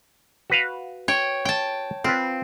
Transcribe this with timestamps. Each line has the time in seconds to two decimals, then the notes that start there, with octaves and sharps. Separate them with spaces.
0.50 F#4 B4 F5
1.08 C#5 G5
1.45 G5 A5
2.04 C4 F4 B4